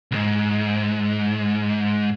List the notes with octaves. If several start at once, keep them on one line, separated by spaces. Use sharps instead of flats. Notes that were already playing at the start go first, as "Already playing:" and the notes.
C2 G#2